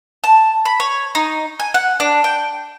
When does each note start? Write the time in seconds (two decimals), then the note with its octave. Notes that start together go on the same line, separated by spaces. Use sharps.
0.24 A5
0.65 B5
0.80 C#5
1.15 D#4
1.60 G#5
1.74 F#5
2.00 D4
2.24 G5